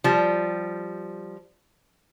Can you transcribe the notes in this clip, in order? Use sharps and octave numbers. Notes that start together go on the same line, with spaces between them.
F3 G3